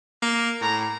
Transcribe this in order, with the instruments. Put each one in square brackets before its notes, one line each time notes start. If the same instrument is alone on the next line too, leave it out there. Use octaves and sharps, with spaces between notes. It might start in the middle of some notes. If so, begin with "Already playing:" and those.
[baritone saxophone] A#3
[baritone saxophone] A2 [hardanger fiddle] A#5